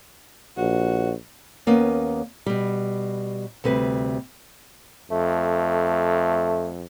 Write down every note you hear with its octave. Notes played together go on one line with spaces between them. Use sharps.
A#1 F#4
D#2 A#3 B3 C#4
B2 G3
D2 C3 G3 B4
F2 A3